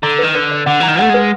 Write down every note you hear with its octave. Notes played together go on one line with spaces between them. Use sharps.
D3 A#5
D#3 B4
D3 B4
D5
D3 F#5
E3 A#5
D#3
A3 F#5
G#3 B4